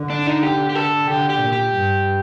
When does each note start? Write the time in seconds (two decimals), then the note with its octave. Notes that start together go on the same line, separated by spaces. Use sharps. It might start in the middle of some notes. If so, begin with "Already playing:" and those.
Already playing: D3
0.10 D4
0.27 D#4
0.43 G4
0.70 G4
0.75 A4
1.08 D3 G4
1.30 G4
1.41 A#2
1.52 G4
1.74 G2